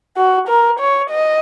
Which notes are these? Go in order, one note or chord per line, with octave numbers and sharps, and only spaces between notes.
F#4
A#4
C#5
D#5